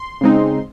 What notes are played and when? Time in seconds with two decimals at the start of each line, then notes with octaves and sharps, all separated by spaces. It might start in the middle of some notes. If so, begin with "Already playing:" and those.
Already playing: C6
0.21 C#3 G#3 C4 D#4